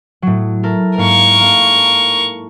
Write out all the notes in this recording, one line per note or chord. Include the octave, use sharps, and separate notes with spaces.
A2 F#3
E4 A4 A#4
G#2 A#3 A#4 C#6
A#3 A4